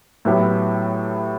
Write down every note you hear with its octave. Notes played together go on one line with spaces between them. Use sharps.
A2 F#3 B3 E4 G4